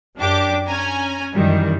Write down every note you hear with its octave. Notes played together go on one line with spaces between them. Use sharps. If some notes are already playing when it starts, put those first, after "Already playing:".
F#2 D4 G4 D6
C#4 G#5 A#5
F#2 D#3 E3 G3